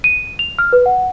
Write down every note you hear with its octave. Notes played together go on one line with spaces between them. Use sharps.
D#7
F7
F6
B4
F#5